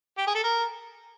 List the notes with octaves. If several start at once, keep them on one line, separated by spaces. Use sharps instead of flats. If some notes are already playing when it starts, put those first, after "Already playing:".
G4
G#4
A4
A#4